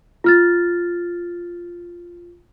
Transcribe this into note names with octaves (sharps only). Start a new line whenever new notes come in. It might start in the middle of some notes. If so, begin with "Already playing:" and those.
F4 F6 A6